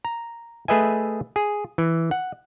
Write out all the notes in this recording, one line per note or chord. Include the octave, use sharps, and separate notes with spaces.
A#5
A3 G#4 B4 D#5 E5 G#5
G#4
E3
F#5